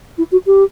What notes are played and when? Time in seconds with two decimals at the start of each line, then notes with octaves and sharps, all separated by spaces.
0.17 E4
0.31 F#4
0.46 G4